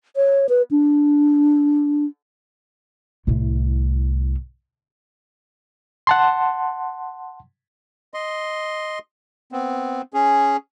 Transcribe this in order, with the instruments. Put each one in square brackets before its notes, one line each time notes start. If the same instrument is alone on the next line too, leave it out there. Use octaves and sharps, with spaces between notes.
[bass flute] C#5
B4
D4
[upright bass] C2 A2
[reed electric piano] F#5 A5 C6
[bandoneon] D#5 C6
B3 C4
C#4 G#4